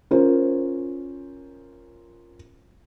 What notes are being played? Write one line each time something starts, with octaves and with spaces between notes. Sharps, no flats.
C#4 F4 A#4 C5